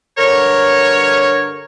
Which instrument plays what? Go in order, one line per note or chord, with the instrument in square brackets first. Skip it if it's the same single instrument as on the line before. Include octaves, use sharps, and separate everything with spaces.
[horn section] G2 D3 C#5 [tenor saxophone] A#4